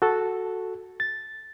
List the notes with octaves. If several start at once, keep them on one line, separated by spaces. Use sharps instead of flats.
F#4 A4
A6